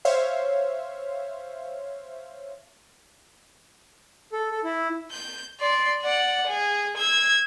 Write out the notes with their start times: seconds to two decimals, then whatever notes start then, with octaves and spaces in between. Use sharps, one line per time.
0.05 C5 C#5 E5 F5
4.33 A4
4.51 A4
4.64 E4
5.12 G6
5.60 D5 C6
6.03 D5 F#5
6.47 G#4
6.97 E6 G#6